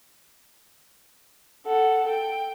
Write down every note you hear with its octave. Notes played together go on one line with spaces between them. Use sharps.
A4 F#5
G5